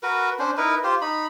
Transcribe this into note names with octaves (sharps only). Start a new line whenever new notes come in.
F#4 A#4 B4
C#4 D4 C5
D#4 E4 A#4 B4
F4 G4 C5
D#4 B5